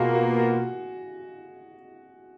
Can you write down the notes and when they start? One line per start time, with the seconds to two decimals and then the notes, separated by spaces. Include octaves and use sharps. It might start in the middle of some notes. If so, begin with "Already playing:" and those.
Already playing: B2 A#3 F4 F#4 G#4
0.15 F#4
0.39 F#4